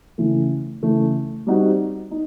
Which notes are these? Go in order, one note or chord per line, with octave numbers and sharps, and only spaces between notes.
C#3 E3 A3
C#3 E3 A3
G3 C4 D#4 F#4
D#4